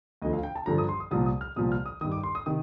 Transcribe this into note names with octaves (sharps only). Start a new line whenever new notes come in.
D2 D3 F3 D#5
F5
G5
A5
G2 D3 F3 A#5
D#6
C6
D#6
C2 A#2 F3 D#6
D#6
F6
C2 A#2 F3 D#6
F6
D#6
G2 D#3 D#6
D6
C6
D#6
C3 D#3 D#6